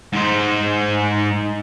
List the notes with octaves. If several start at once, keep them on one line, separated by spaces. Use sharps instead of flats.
G#2 C5